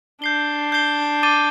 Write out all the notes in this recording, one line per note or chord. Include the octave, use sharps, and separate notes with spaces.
D4 G6 C7 G7
G6 C7 G7
D6 A6 D#7 G7